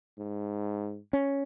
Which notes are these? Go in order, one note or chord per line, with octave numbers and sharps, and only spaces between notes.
G#2
C#4